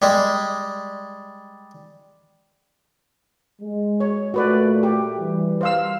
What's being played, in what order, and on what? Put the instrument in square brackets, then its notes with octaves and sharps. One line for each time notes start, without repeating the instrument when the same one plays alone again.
[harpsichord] G3 G#3
[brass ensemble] G#3
[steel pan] C#5
[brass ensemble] A#2 A3 [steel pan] F#4 B4 D5
[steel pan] G4
[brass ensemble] E3 G3
[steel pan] C5 F5 E6